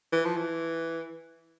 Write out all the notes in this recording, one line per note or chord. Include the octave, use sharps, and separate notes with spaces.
E3
F3
E3